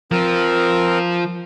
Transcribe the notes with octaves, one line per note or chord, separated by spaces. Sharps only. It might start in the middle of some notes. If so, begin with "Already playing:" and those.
F3 C4 A#4